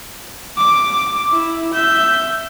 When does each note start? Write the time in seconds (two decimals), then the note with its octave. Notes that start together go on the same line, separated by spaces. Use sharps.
0.58 D6
1.30 E4
1.74 E5 G6